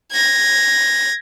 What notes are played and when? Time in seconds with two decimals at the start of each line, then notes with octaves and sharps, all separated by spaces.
0.12 G#6 A#6